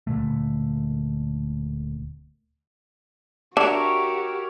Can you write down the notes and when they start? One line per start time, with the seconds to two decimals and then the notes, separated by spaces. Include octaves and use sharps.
0.07 D1 A#2 D3 A3
3.57 D4 F#4 G4 A#4 C#5 E5